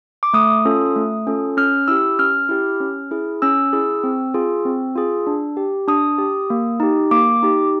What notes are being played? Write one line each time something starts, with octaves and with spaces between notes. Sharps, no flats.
D6
A3 D#6
C#4 F4 A4
A3
C#4 F4 A4
C#4 F6
E4 G4 E6
C#4 F6
E4 G4
C#4
E4 G#4
C#4 E6
E4 G#4
C4
F4 G#4
C4
F4 G#4
D4
G4
D4 D#6
G4
A#3
D#4 G4
A#3 D6
D#4 G4